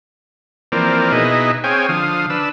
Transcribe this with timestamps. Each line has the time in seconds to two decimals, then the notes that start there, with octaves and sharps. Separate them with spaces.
0.72 E3 F3 A#3 C4 A#4 D5
1.12 B2 D#4 E4 G#4 B4 D#5
1.64 C4 G#4 C#5 F5 G5 G#5
1.89 D3 F3 F5 D#6
2.30 D4 B4 E6